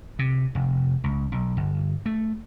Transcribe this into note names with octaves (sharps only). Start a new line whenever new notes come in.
C3
F1
C#2
B1
G1
A3